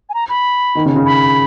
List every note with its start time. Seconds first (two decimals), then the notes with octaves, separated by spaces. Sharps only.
0.09 G#5
0.14 A#5
0.29 B5
0.75 D#3
0.85 C#3
0.96 C#3
1.06 B5